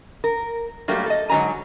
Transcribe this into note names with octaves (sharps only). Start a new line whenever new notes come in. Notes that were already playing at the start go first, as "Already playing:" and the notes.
A#4
G2 F#3 A3 A#3 G4
A4 D#5
G#2 D3 F#3 G#5 A#5